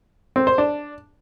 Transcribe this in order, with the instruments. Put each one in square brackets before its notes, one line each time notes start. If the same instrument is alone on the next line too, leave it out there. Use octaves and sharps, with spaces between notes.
[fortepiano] C4
C5
D4